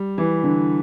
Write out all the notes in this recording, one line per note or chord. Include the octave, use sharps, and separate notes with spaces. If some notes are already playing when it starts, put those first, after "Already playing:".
Already playing: G3
E3
D3